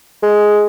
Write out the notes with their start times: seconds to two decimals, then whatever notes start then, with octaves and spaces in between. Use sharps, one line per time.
0.23 G#3